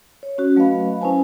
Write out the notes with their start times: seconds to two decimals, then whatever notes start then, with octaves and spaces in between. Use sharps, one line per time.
0.23 C#5
0.38 C#4 F#4
0.56 F#3 A3 B4 D#5 F5 B5
1.01 C#4 E4 B4 C5 G#5 A5